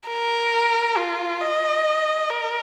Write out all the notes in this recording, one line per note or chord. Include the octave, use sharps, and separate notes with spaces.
A#4
F4
D#5
A#4